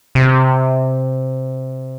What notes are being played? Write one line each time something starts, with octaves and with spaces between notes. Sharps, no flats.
C3